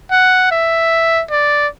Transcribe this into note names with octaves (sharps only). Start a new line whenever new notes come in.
F#5
E5
D5